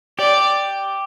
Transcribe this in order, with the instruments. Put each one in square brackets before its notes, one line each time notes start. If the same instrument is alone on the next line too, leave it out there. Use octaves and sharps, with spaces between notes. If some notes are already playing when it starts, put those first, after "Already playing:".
[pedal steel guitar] G4 [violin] D5